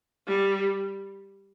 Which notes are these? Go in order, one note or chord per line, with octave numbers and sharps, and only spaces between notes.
G3